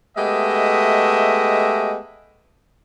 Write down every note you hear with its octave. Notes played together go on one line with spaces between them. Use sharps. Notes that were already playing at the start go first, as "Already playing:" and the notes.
G#3 A3 B3 G4 D#5 E5